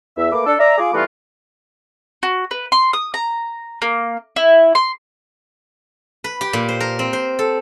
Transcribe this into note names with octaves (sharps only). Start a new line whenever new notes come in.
E2 E5
A3 A#3 B4 D6
D4 A4
D5 E5 A#5
F4 G#4 D6
E3 G3 A3 B3 F4 F#4
F#4
B4
C6
D#6
A#5
A#3
E4
C6
B4
G4
A#2
C5
A#4
C4
C5
A4